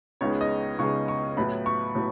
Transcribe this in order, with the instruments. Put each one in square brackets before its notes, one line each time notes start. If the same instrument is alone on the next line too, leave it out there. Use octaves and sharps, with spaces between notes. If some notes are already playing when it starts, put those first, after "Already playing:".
[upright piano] C#2 C#3 G#3 B3 D#4 C#5
D#5
C#2 C#3 G#3 B3 D#4 C#6
C#6
A2 F#3 B3 E4 B5
C#6
A2 F#3 B3